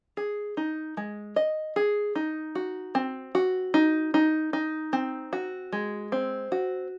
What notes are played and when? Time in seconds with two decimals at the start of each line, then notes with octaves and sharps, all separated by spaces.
0.17 G#4
0.57 D#4
0.97 G#3
1.36 D#5
1.76 G#4
2.15 D#4
2.55 F#4
2.95 C4
3.35 F#4
3.74 D#4
4.14 D#4
4.53 D#4
4.93 C4
5.33 F#4
5.73 G#3
6.12 C4
6.52 F#4